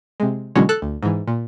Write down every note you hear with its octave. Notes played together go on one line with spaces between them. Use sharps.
C3 G#3
B2 D3 E3 F#3 G#3 C#4
A4 F#6
D2
G#2 E3
A#2